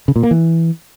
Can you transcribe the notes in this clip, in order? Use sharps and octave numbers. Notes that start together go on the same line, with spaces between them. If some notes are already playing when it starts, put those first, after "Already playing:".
C#3
A#2
A#3
E3